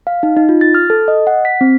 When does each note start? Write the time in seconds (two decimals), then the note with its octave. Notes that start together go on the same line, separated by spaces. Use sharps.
0.07 F5
0.23 D#4
0.37 D#4
0.49 F4
0.61 A6
0.75 F6
0.90 A4
1.08 D#5
1.27 F#5
1.45 B6
1.61 C4